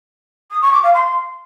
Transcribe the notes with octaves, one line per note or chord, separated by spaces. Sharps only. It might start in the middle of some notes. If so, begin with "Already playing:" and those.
D#6
C#6
D6
F5
C6